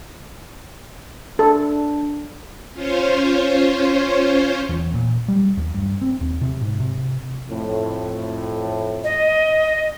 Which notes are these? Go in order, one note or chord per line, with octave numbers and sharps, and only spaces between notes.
D4 A4
C#4 F4 C5 C#5
E2
A#2
G3
D#2
G2
C4
D#2
C3
G#2
C3
F2 A2
D#5